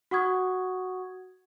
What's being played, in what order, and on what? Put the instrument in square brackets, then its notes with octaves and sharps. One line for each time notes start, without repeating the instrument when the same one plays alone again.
[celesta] F#4 F#5 C#6 D#6 G#6